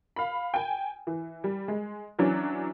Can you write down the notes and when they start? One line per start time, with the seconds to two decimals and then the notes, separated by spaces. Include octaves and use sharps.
0.16 F5 B5
0.54 G5 G#5
1.07 E3
1.44 G3
1.68 G#3
2.19 E3 F#3 C#4 D4